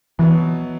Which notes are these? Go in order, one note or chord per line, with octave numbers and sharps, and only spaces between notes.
B2 E3 F#3 B3